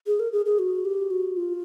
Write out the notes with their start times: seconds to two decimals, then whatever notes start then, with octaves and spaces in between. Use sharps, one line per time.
0.07 G#4
0.20 A#4
0.32 G#4
0.46 G#4
0.59 F#4
0.85 G4
1.11 F#4
1.37 F4